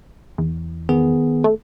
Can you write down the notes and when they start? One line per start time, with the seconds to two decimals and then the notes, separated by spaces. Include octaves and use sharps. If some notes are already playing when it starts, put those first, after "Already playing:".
0.38 E2
0.89 D#3 B3 G#4
1.44 A3